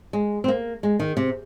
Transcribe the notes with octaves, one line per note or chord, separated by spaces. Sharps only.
G#3
C4
A#3
G#3
D#3
C3